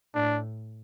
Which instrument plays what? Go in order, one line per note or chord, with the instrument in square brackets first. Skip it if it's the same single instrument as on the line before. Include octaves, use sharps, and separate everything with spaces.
[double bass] A2 [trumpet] D4